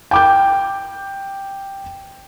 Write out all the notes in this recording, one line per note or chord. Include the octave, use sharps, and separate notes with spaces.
G5 D6 G6